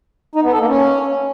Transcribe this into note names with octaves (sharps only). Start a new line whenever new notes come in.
D#4
B3
A4
A#3
C#4